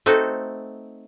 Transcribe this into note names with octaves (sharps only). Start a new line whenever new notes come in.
A3 C4 D#4 F#4 A4